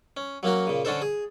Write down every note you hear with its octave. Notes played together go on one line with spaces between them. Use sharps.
C#4
F#3 A#3 C#4 F#4
A#2 C#3
D3 C#4 D4 A4 C5
G#4